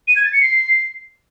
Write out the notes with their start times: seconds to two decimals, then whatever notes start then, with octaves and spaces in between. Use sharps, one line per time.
0.07 D#7
0.16 G#6
0.24 A6
0.32 C#7
0.41 C7